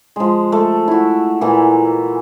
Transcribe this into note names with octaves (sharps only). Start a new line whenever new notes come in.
F3 G#3
A3
E4 F#4
A#2 E3